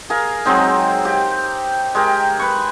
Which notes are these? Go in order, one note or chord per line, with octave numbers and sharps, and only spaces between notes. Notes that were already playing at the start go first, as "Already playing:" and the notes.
G#4 A#4 F5
F#3 G#3 C4 D#4
G4 F5
G#3 G4 A#4
B4 C#6